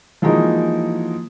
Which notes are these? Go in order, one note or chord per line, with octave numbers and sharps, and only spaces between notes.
E3 F3 G#3 A#3 D#4 F#4